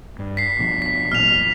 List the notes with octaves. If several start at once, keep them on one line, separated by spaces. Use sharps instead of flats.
G2
B6 C7
B2 F3
B6
A1 A#2 F#3 F6 F7
F2